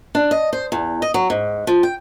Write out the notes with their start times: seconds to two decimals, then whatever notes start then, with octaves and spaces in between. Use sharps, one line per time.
0.15 D4
0.31 D#5
0.53 C5
0.72 E2
1.02 D#5
1.14 F#3
1.30 G#2
1.67 F3
1.83 G5